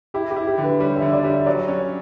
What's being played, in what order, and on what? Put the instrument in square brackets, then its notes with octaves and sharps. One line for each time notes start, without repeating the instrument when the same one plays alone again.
[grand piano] E4 [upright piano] G4
[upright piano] G4
[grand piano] E4
[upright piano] G4
[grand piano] D3
[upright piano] B4
[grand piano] G3 [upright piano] C#5
[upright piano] E5
[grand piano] D3
[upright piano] E5
D5
[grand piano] G3
[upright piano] E5
[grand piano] F#3 [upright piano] D5
[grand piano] C#4